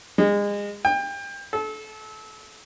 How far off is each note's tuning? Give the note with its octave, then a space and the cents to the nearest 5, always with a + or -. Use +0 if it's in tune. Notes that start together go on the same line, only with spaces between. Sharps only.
G#3 -30
G5 +30
A4 -30